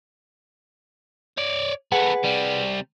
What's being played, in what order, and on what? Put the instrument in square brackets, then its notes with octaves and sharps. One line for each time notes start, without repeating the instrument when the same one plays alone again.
[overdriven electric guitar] C#5 D5
[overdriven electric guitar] A3 B3 [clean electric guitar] G#4 B4 F#5
[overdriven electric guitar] C3 G3